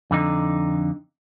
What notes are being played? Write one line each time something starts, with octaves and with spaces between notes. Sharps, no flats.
F2 D3 D#4